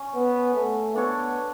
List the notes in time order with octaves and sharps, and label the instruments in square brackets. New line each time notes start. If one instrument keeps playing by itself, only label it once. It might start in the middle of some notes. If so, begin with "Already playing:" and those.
Already playing: [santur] C#4
[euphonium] B3
A3
[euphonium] B3 [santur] D4 A4 C#5